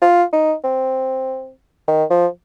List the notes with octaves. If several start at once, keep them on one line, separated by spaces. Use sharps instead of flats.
F4
D#4
C4
D#3
F3